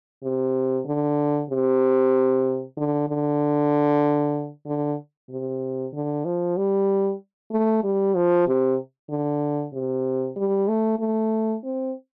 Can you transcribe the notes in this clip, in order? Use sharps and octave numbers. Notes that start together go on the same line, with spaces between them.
C3
D3
C3
D3
D3
D3
C3
D3
F3
G3
A3
G3
F3
C3
D3
C3
G3
A3
A3
C4